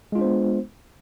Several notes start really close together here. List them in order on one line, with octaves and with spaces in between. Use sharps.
G#3 F4 D4 C5 B3